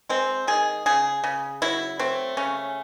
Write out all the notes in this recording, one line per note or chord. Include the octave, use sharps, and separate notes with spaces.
G#3 C4
D#3 G#4
C#3 G#4
C#3
F#3 E4
A3 C4
C#3 C#4